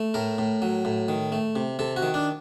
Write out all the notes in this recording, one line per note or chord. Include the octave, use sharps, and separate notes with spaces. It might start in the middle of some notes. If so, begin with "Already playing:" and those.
Already playing: A3
A2 A#4
A2
F#3
A2
D#3
A3
C3
C3 A4
F#4
D#3
D4